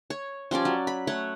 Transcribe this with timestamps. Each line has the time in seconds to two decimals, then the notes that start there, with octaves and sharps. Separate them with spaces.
0.10 C#5
0.51 F3 G3 C#4 D5
0.65 F#3
0.87 B5
1.07 A3 C#5 F#5